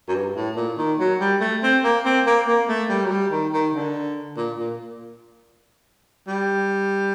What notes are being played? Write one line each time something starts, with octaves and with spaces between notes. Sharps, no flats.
F#2
G2
A2
A#2
D#3
F#3
G3
A3
C4
A#3
C4
A#3
A#3
A3
G3
F#3
G3
D#3
D#3
D3
A#2
A#2
G3